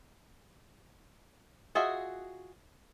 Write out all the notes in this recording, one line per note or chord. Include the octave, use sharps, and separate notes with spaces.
F4 F#4 G#4 D#5 E5